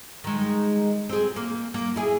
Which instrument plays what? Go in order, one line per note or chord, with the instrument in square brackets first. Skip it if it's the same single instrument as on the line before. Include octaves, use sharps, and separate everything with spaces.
[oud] D#3 G#3
C4 G#4
A#3
A#3
E4 G#4